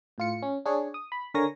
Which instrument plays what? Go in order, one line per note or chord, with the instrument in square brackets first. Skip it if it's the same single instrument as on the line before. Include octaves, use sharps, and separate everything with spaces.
[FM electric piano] A2 F4 C#7
C#4
D4 G#4 C#5
D#6
B5
D3 A#4 C#5 G#5 A#6